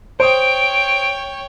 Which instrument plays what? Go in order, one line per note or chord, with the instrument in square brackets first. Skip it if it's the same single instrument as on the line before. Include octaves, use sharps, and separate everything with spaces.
[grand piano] C5 D#6 [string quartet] C#5 G5 [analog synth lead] D7